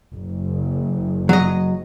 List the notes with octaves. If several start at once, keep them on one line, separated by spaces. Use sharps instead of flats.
F#1
F#3 D#5